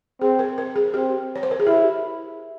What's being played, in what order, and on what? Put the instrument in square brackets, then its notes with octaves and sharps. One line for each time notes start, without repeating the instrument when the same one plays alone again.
[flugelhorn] C4 [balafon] G#4
[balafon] A#4
A#4
G#4
[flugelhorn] C4 [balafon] G4
[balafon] C#5
C5
A#4
G#4
[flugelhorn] E4 [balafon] G4